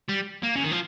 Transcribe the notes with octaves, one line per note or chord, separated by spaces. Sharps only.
G3
A#3
C#3
D#3
F3